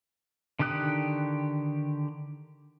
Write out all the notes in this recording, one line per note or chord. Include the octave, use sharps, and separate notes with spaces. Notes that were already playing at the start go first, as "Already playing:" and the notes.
D3 D#3 G4 D#6 F#6